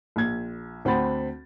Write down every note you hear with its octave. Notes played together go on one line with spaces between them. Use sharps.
A#1 G#6
D2 C4 F#5 B5 A6